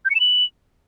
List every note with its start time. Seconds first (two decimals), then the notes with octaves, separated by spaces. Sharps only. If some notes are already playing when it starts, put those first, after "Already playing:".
0.05 G6
0.10 C#7
0.15 E7
0.20 F#7